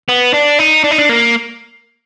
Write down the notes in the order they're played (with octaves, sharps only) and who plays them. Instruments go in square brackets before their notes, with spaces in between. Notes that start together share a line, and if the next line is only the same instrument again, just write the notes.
[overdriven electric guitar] B3
D4
D#4
D4
D#4
D4
A#3